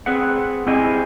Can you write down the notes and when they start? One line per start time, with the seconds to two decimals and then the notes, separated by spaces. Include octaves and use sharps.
0.06 C4 G#4 B4 F#5
0.67 C4 E4 G4 G#4 D#5 G#5